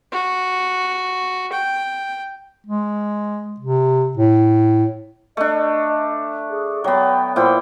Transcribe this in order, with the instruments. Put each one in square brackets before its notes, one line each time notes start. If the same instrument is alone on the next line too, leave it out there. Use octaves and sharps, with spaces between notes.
[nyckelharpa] F#4
G5
[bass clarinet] G#3
C3
A2
[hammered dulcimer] A3 D4 [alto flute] D#5
[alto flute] G#4
[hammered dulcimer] F#3 B3 [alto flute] G5
[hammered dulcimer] A#2 E4 G5 [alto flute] C5